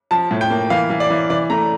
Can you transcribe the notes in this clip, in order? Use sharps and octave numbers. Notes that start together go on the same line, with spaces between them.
F3 A5
A2
G5
A#3
E3 F5
E3
D5
E3
E3 D5
A3 A#5